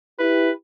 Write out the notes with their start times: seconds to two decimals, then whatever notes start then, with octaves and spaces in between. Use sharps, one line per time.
0.19 E4 G4 B4